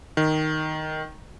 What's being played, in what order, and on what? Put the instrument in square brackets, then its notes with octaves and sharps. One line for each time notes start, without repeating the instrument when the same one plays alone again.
[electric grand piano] D#3